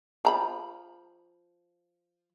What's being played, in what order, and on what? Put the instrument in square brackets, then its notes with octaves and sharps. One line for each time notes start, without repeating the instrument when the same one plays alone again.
[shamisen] F3 A#5 B5